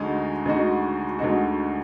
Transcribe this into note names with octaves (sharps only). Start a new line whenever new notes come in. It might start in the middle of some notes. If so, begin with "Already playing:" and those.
Already playing: D2 D3 G#3 D#4 F#4
D2 D3 G#3 D#4 F#4
D2 D3 G#3 D#4 F#4